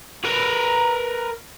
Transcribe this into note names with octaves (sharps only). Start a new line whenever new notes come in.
A#4 B4